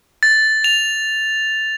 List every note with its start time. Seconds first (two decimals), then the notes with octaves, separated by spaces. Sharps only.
0.23 A6
0.64 F7